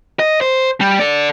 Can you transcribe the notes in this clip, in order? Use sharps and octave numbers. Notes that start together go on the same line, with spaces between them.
D#5
C5
G3
A4 D5